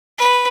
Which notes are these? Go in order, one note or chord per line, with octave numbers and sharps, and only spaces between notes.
B4